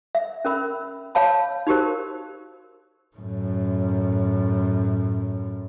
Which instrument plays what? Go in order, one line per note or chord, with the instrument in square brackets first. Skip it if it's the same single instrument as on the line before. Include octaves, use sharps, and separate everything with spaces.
[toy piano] E5
C#4 A#4 B5
C#5 F5 A5 B5
D#4 F#4 G4 A#4 C5
[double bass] F#2 A2